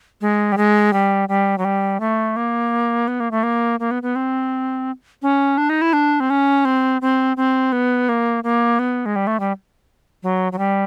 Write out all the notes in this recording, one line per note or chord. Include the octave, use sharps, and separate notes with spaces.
G#3
G3
G#3
G3
G3
F#3
G3
A3
A#3
B3
A#3
A3
A#3
A#3
B3
B3
C4
C#4
D4
D#4
E4
D4
C4
C#4
C4
C4
C4
B3
A#3
A#3
B3
G#3
G3
A3
G3
F#3
F#3
G3